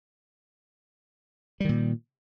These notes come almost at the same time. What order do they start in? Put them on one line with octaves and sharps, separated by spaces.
G3 D#3 A#2